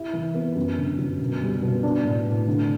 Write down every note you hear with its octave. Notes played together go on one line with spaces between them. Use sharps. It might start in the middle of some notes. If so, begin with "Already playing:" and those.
Already playing: E4 G4
E3
B3
F#2
D3
F#2
B2
G3
B2
D4
A2
A2
D3